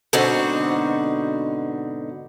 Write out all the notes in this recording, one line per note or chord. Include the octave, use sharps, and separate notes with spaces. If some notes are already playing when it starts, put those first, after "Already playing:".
G#2 B2 D3 C4 D#4 F#4